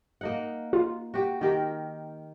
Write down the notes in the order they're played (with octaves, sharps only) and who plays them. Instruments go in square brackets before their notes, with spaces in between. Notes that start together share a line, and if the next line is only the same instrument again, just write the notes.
[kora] A#3 D#4 F#5
[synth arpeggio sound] F4
[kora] F#4 G4
D#3 G4 A#4